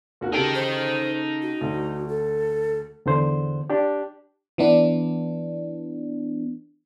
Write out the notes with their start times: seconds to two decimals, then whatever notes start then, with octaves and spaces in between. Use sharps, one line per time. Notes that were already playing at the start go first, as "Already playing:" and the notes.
0.21 D#2 F#4 A#4
0.33 C#3 D#4 G4 A4 G5
0.55 C5
1.42 F#4
1.61 D2
2.08 A4
3.06 E2 D3 C5
3.70 D4 G4
4.58 E3 B3 D4